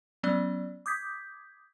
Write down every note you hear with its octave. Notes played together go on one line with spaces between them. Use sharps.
F#3 B3 C#4 D5
D6 D#6 G6 G#6 B6